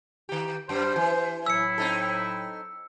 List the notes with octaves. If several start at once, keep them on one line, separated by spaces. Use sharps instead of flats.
D#3 G4
F#2 G3 C5
E3
A2 F#3 E4 E6 C#7
C4 D#4 A4